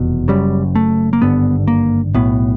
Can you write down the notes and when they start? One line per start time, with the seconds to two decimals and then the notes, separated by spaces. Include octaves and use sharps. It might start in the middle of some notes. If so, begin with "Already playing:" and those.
Already playing: F1 E2 B2
0.28 F#1 F#2 C#3 G3
0.75 A3
1.13 A#3
1.22 G#1 G2 D3 B3
1.68 A#3
2.14 B1 A2 B3